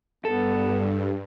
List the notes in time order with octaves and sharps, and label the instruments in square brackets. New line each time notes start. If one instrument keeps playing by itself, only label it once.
[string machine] G2 [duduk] B3 [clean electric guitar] A4